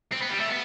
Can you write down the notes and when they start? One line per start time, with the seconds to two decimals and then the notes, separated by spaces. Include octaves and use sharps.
0.13 C4
0.22 B3
0.31 G3
0.40 A3
0.49 B3